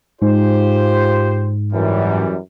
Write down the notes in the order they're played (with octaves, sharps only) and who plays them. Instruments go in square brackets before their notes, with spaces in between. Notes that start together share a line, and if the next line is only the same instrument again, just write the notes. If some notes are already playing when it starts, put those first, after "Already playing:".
[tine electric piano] G#2 [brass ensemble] F4 G4 C5
[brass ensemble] F#2 E3 G3